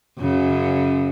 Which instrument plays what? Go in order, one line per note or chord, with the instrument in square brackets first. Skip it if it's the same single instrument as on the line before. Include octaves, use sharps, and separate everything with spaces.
[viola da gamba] F#2 C#3